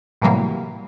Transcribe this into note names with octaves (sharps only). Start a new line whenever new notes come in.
A2 C3 E3 F#3 G3 A#3